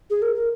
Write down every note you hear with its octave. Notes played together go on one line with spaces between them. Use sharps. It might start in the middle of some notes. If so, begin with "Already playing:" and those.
G#4
A#4
A#4